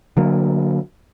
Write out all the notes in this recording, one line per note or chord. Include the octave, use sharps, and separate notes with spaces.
D3 F#3 A#3